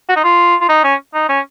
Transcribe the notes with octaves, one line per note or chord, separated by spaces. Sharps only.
F#4
D#4
F4
F4
D#4
C#4
D#4
C#4